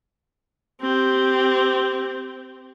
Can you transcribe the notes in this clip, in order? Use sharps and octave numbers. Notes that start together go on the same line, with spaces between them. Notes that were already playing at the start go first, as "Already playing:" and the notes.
C4 G4